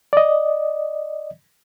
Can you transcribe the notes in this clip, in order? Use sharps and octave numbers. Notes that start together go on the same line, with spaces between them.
D5 D#5